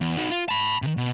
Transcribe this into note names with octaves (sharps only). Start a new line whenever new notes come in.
E2
D#4 F#4
F4
A5 B5
C3 D#3
B2